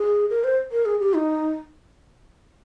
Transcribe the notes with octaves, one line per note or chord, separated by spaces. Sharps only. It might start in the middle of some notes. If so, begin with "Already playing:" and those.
Already playing: G#4
A#4
C5
A#4
G#4
G4
D#4